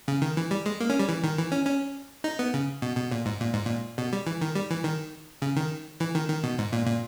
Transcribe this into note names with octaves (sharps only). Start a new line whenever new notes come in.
C#3
D#3
E3
G3
G#3
A#3
C#4
G3
E3
D#3
E3
C#4
C#4
D#4
B3
C#3
B2
B2
A#2
G#2
A#2
G#2
A#2
B2
G3
E3
D#3
G3
E3
D#3
C#3
D#3
E3
D#3
D#3
B2
G#2
A#2
A#2